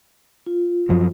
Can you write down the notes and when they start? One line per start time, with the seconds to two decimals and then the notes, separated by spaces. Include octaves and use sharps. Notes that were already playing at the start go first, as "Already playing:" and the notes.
0.46 F4
0.89 F#2 F3 F#3